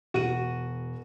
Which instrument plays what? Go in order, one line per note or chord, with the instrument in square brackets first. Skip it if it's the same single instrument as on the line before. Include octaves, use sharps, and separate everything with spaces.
[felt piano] E1 D#7 [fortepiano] F#4